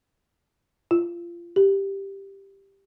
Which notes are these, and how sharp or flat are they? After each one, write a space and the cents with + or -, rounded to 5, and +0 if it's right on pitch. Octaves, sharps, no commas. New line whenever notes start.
F4 -25
G4 +0